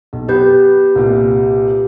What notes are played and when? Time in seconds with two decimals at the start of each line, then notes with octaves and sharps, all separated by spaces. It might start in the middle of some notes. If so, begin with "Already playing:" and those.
0.13 B1
0.29 B3 G4 B4 G6
0.95 C2 A#2